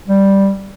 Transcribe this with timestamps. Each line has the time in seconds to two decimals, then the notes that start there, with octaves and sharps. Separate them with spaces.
0.08 G3